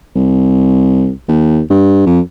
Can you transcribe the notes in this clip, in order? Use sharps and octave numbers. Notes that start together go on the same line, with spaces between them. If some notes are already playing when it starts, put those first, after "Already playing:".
C2
D#2
G2
F2